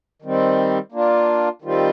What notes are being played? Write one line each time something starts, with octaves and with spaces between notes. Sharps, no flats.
D#3 G3 C4
A#3 D4 F4
D#3 G3 C4 F4